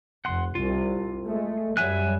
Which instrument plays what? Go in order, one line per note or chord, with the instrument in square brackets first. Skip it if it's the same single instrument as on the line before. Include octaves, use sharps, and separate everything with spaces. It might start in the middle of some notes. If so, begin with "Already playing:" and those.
[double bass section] F1 [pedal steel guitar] F#5 C6
[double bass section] C2 C3 [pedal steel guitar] F4
[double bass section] G#3 A3
[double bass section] F#2 F#3 G3 [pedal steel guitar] E5 G#5 F#6